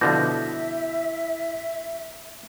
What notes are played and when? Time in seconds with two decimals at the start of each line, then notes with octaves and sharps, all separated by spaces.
0.01 B2 D3 F3 E4 E5 D6 G6 A#6